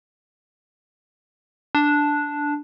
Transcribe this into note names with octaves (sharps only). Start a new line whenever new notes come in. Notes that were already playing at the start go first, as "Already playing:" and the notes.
D4